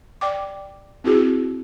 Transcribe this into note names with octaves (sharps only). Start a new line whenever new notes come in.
D5 G5 D6
C4 E4 F#4 G#4